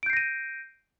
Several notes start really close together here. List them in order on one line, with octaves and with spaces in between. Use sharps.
D7 G6 C7 A#6 D#7